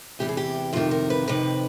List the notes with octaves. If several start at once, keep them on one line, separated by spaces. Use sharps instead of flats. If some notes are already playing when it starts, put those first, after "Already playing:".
E2 C3 E3 G4
G#4
G4
F2 C3 D#3 F4
A#4
B4
F2 C3 D#3 B4